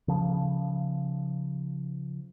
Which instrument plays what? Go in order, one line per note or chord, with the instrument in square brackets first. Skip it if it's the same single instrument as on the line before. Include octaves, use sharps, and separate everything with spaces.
[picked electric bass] C#3 F3